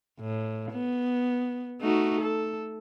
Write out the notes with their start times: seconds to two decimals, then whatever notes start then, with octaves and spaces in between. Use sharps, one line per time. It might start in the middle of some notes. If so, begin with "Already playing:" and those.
0.20 A2
0.72 B3
1.81 A3 D#4 F#4
2.21 A4